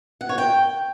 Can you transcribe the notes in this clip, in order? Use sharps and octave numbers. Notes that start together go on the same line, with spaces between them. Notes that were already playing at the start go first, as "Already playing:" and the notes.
F#5
C#5
G5